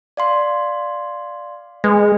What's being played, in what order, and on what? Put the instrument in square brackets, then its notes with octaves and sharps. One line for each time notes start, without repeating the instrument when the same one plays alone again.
[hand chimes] D5 F5 C6
[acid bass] G#3 [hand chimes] B4